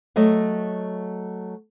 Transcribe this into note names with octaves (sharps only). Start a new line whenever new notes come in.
F#3 A3 D#5